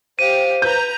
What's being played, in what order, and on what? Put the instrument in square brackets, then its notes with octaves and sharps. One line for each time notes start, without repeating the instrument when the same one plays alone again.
[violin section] G4 F5 [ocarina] C5 [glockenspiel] D#7
[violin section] B4 A#5 [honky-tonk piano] G6